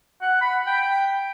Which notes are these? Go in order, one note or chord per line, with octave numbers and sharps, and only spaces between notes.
F#5
B5
G5